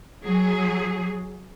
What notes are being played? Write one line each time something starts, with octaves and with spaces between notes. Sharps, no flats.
F#3 G#4